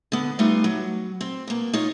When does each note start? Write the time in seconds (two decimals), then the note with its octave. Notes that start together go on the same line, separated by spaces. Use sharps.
0.12 D3 B3
0.39 G3 A3 B3 D#4 F4
0.64 F#3
1.21 C4
1.47 B2 A#3
1.73 D#4 F4 C#5